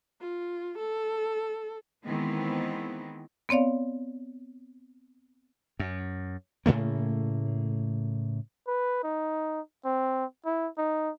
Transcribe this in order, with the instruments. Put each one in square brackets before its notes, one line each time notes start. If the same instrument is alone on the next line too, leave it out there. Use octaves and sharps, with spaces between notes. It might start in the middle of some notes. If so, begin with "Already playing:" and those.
[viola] F4
A4
[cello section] D#3 E3 G#3 B3 C4
[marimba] B3 C4 C#5 D5 F5
[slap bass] F#2
A2 C#3 A3 A#3
[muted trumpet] B4
D#4
C4
E4
D#4